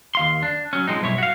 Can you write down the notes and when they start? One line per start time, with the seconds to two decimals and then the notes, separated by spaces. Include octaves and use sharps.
0.15 D#2 F5 C6
0.43 D4
0.73 F#3 C#4
0.87 F3 G#3 C4 D#4
1.01 B1 G2 E4 C#5
1.18 F#4 F5